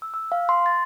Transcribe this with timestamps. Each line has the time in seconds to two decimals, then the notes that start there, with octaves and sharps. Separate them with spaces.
0.02 E6
0.14 E6
0.32 F5
0.49 C6
0.66 A6